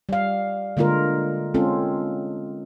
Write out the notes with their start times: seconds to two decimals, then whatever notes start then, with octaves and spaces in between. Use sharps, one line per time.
0.09 G3 F5
0.77 D3 G#3 A#3 F4 A#4
1.54 G#3 C4 C#4 F4 A4